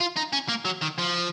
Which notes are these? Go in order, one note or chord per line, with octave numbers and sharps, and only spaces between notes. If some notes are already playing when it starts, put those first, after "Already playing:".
F4
D#4
C#4
A#3
F#3
D#3
F3